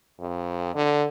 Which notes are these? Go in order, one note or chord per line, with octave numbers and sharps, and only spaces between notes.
F2
D3